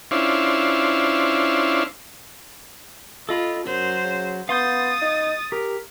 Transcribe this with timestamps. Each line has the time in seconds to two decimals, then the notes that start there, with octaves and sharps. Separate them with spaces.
0.11 C#4 D4 E4 F4 C5
3.29 F4 A4 D#5 B5
3.67 F#2 F#3 C5
4.04 C#3
4.49 B3 F5 C6 D#6 G6 A6
5.02 D#4
5.52 G4 A#4